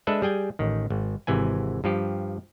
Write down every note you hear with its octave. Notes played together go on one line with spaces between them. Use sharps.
G#3 D4 A4 B4 E5
G3 G#4 G5 G#5
A1 D#3
G#1
G#1 C3 E3 G#5
G2 F3 G4